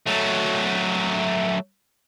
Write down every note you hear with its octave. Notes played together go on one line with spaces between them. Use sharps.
F#3 A3